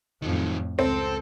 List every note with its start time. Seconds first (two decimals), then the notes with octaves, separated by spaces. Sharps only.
0.22 F2 A2 D#3 F#3
0.79 C#2 C4 A4